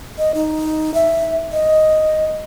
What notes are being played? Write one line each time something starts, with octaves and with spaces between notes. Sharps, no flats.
D#5
D#4
E5
D#5